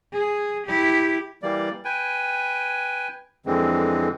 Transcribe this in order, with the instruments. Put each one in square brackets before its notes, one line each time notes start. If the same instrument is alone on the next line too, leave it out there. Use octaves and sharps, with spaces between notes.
[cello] G#4
E4 G4
[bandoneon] E3 G3 A#3 D5
B4 G5 G#5
F2 D3 E3 G#3 C4